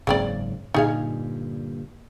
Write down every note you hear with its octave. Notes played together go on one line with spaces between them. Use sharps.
F#1 G#2 C#3 A#3 C4 D5
G2 A#2 D3 D#4 G#4 F5